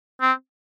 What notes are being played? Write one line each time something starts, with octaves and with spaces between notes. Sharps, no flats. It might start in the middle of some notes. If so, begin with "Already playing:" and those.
C4